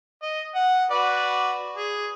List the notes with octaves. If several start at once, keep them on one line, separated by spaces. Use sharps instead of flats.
D#5
F#5
F#4 B4 D5
G#4